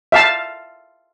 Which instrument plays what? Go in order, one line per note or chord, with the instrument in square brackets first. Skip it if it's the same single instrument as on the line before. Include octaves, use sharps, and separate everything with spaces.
[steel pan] E5 F5 A5